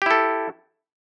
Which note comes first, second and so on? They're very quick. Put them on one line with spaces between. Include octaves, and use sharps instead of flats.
G4 E4 A4